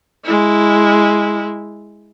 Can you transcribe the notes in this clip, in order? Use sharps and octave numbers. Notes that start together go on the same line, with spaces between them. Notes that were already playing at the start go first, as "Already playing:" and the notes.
G#3 E4